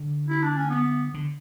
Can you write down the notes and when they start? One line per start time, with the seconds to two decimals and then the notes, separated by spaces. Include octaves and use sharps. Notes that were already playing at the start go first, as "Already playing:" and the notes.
Already playing: D3
0.28 E4
0.42 D4
0.56 C#4
0.70 B3
1.14 D3